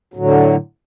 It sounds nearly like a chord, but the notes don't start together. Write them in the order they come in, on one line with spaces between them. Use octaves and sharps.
F#3 A2 D3